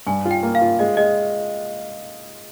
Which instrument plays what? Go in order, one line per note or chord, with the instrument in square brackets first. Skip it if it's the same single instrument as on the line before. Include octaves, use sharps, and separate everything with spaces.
[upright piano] G2 [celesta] G#5
[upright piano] F4
[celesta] G5
[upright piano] A#3
[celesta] F5
[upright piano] F4
[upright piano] G#3 [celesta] D#5
[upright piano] G#3 [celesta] D#5